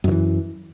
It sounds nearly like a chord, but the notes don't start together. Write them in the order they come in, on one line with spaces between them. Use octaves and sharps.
F#2 D#3 E3